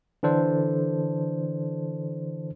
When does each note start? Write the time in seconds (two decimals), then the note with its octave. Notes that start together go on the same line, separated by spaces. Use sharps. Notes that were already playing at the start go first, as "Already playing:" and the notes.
0.23 D3 E3 D4 A4 C5